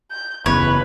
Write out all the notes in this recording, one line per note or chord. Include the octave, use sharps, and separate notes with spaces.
G6
F#1 E2 C#3 B4 C#5